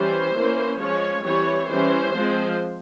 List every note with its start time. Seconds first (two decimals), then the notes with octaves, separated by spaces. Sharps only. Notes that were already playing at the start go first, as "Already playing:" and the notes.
Already playing: E3 G3 C#4 C5
0.34 E3 A#3 C#4
0.79 F3 G#3 C#4 C#5
1.25 E3 G3 C4 C#5
1.70 E3 G3 C#4 C5
2.15 F3 G#3 C4